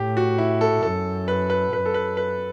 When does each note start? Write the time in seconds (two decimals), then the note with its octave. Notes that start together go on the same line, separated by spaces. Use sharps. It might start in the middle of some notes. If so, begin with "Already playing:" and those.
Already playing: A2 G4
0.17 F#4
0.38 E4
0.61 A4
0.83 F#2 A4
1.28 B4
1.50 B4
1.72 F#2 B4
1.86 A4
1.94 B4
2.17 B4